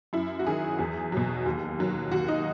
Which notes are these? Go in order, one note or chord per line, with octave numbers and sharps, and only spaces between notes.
F#2 E4
F#4
D#3 F#3 G#4
E2 G#4
B2 F#3
D#2
D#3 F#3
D#2 F#4
D#4